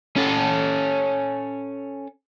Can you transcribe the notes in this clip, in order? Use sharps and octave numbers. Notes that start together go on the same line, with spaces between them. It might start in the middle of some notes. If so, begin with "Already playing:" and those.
C#4 A4